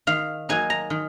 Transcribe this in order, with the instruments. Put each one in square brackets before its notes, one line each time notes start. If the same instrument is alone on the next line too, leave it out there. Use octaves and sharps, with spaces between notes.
[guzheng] D#3 F5
F#3 A#3 D#4 G#5
A#5
D#3